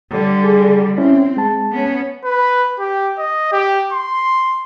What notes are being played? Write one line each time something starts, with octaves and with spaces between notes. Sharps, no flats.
D3 G3
G#4
C4 C#4 E4
G#3 A5
B3 C#4
B4
G4
D#5
G4
C6